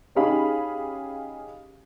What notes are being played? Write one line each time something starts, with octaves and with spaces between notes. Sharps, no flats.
C#4 D#4 G4 G#4 F5 B5